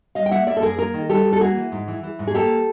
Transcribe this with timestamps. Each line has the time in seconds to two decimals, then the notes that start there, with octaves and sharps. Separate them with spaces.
0.15 G3 D#5 F5
0.26 G5
0.31 A#3 E5 F#5
0.47 A#3 D5 E5
0.57 A4
0.62 F#2 G#4 A#4
0.78 A#3 G#4 A#4
0.94 D#3
1.09 G3 G4 A4
1.25 G3
1.33 A4
1.41 A#3 F#4 G#4
1.57 E3
1.72 G#2
1.88 E3
2.03 E3
2.19 G#2
2.28 G#4
2.34 A#3 G4 A4